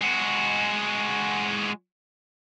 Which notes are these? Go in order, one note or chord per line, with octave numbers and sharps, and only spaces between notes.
G#3 F#4